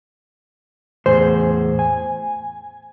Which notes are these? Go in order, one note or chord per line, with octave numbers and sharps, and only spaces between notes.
E2 A2 G#4 C5
G#5